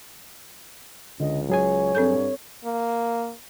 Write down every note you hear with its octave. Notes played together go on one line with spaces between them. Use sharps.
C#2 D3 D#5
F#3 G#4 C#5 G#5
G2 C4 A4 G6
A#3